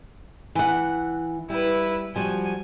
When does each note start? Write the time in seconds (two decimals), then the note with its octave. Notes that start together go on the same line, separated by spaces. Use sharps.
0.55 E3 F#5
1.50 G3 E4 B4
2.16 F3 G3 F#4 G#5